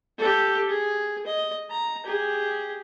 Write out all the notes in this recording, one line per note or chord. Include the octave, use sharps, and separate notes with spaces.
G4 A4
G#4
D#5
A#5
G4 G#4